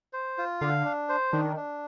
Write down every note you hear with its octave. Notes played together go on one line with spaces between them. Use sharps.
C5
F4
D3 F5
D4
C5
D#3 D4
D4